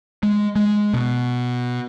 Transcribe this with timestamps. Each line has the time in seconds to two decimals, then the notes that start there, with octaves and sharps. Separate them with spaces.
0.23 G#3
0.56 G#3
0.94 B2